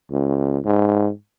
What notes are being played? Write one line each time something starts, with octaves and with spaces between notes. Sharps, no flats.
C#2
G#2